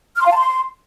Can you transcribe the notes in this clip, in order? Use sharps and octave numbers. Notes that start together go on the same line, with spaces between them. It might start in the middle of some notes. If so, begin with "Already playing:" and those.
F6
C6
F5
A5
C6